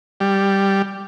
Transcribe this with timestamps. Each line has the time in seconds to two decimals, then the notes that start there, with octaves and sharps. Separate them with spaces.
0.20 G3